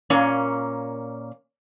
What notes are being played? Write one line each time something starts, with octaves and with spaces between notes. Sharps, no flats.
A#2 A#3 C#4